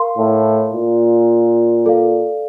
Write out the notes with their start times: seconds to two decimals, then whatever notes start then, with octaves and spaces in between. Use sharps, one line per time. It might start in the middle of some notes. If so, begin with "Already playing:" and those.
Already playing: A#4 F5 C6
0.18 A2
0.73 A#2
1.86 A4 D5 F5